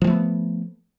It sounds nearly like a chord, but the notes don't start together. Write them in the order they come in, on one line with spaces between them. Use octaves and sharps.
F3 G3 A3 B3